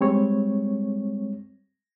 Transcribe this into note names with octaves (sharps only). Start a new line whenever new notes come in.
G3 G#3 C4 C#5